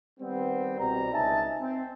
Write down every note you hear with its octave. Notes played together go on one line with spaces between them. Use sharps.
D#3 G3 B3 C4
C2 B2 G3 C4 A#5
C#2 D#4 E5 G#5 A5
C4